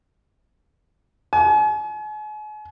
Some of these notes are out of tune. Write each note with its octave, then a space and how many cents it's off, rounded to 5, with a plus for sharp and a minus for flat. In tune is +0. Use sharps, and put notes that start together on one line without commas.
G#5 +40